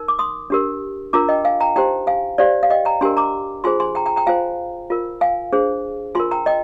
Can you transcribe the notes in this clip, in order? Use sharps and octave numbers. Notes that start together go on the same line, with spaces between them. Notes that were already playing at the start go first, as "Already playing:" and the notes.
Already playing: D#4 A#4
D6
C6 D#6
D4 G4 A#4
D4 F4 A#4 A#5 D6
D#5 G5
F5 G#5
G5 A#5
D#4 G4 C5 G5 A#5
F5 G#5
D#4 G4 C5 D5 F5
F5
D#5 G5
G5 A#5
D4 G4 A#4 G#5 C6
A#5 D6
F4 G#4 C5 G#5 C6
G#5 C6
G5 A#5
G5 A#5
G5 A#5
F4 C5 F5 G#5
F4 A#4
F5 G#5
D4 G#4 C5
F4 A#4 G#5 C6
G5 A#5
D#5 G5